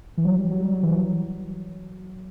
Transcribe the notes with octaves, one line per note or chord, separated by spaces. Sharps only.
E3
F#3
G3
F#3
G3
F#3
E3
F#3